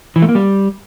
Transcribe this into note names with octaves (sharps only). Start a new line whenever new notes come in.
E3
A3
A#3
G3